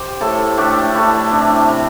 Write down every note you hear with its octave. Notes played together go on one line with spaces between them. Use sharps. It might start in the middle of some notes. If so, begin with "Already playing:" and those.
Already playing: G4 C5
A2 E4 A4
A3 D4 G4
A3 E4
C3 D4
C3